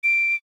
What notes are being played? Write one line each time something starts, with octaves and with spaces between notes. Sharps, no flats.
D7